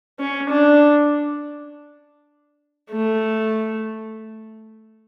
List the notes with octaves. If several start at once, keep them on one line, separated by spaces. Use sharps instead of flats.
C#4
D4
A3